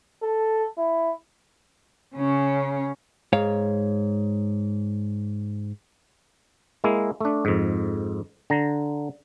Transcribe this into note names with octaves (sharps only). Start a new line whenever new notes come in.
A4
E4
C#3 C#4
G#2 C#5 F5
G#3 A#3 E4
A3 D4
F2 G#2
D3 A#5